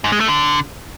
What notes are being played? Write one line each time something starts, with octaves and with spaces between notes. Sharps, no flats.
G#2
G#3
A3
D3